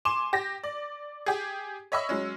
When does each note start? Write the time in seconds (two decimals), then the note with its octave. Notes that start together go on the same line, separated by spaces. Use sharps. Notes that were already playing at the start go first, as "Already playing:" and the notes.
0.05 G#5 C6 D6 E7
0.33 G4 A#6
0.64 D5
1.26 G4 G#4
1.92 C#5 D#5 E5 B5 C#6 E6
2.09 F#3 G#3 C#4